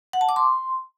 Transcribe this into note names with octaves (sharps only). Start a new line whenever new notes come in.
F#5
A5
D6
C6